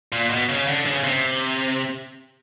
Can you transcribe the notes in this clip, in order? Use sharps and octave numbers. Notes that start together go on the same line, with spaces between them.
A#2
B2
C#3
D3
C#3
C3